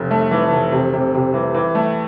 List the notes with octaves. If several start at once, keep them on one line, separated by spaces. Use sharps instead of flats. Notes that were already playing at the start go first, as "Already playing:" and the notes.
Already playing: F1
A3
E3
F1
C3
C3
C3
E3
E3
A3